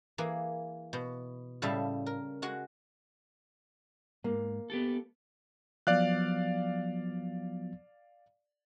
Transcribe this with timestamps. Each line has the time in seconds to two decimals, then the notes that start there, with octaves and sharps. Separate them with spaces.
0.18 E3 A#3 G#4
0.93 B2
1.62 A2 C#3 G3 E5 F5 A5
2.06 A#4
2.42 G#3 F#4 F#5
4.24 G#2 A#3
4.70 B3 G4 A4
5.87 F3 F#3 B3 D5 F5 F#6